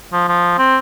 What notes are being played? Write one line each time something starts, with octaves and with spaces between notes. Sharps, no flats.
F3
F3
C4